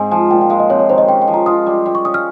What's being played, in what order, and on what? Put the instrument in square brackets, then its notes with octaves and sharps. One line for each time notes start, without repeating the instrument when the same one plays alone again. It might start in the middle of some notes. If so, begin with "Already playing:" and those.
Already playing: [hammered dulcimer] G#2 G#3 C4 [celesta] G#5
[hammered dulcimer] F3 [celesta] G#5
[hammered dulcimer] A#2 [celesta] G5
[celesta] G5
[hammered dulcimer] G#3 [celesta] F5
[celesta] D#5
[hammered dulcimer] C3 [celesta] C#5
[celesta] C#5
[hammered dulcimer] D#3 [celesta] C5
[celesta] D#5
[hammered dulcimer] C#4 [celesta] G5
[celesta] G5
[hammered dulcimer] F3
[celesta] A#5
[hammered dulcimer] F4 [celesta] D#6
[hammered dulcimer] G3
G3
[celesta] C#6
[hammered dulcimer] C#4 [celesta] D#6
[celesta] F6